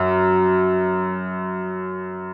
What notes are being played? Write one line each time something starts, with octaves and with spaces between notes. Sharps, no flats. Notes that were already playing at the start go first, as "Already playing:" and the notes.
Already playing: F#2